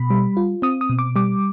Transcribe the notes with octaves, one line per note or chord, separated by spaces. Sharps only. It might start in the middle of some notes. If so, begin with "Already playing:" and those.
Already playing: B2 B5
G3
F4
C4 D#6
D#6
B2
D6
G3 D6